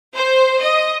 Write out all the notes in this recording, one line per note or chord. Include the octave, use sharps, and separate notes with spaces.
C5
D#5